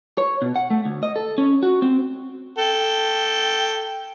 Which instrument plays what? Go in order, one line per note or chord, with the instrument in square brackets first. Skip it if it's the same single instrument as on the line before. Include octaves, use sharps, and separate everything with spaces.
[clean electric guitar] C#5
B2
F#5
A3
D2
D#5
A4
C#4
F#4
C4
[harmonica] A4 G5